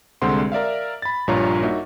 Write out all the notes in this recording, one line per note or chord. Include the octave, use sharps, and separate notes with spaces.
C2 D3 G#3 C4 F#5 C6
A#4 D5 E5 F5
B5 A6
A#1 G2 A#2 F4 C#5 A#5
A#3 D#4 F#4 E5